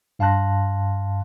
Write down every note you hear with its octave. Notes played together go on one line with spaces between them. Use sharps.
G2 F5 A5 C6 F#6 A#6